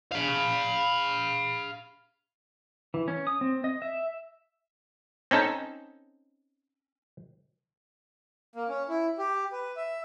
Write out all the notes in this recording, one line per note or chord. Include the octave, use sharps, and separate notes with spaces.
F5 B5
E3
C#4
D#6
C4
D#5
E5
C4 C#4 D#4 A4
A#3
C#4
E4
G4
B4
E5